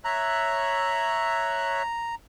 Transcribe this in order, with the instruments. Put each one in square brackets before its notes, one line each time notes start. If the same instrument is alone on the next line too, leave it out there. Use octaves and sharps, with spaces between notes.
[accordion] C#5 E5 F#6 [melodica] A#5